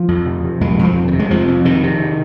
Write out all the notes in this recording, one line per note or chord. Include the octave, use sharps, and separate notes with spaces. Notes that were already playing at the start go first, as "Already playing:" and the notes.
Already playing: F3
F2
C3
C3
F2 G#3
F2
F3
C3
D#3
C3
G#3
F2 F3
F2
C3 D#3
C3